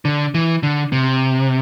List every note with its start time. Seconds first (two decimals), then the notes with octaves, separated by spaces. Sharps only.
0.05 D3
0.35 E3
0.63 D3
0.92 C3